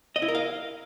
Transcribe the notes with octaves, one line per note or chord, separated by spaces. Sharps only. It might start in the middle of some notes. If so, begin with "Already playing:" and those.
D#5
E4
A#4
F5